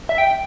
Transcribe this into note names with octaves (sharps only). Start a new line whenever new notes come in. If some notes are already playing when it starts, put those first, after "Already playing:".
E5
G5